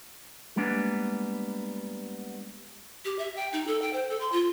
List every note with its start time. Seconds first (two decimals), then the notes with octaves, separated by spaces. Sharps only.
0.56 G3 G#3 A#3 B3 D4
3.05 G4
3.19 E5
3.36 G5
3.53 D#4
3.67 A4
3.82 G5
3.93 C5
4.09 A4
4.21 C6
4.32 F4